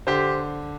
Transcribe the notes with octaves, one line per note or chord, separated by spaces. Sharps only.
D3 G4 C5